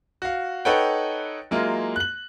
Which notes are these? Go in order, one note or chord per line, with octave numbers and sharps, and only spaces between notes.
F#4 F5
D#4 A4 B4 C#5 F#5 G5
F#3 G#3 A#3 E4 F4
F#6 F#7